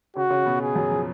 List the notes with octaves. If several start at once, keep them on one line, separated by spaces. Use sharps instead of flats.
C#3 C#4 F#4
C#3 C#4
B2 B3
G#4
F#2 F#3
F3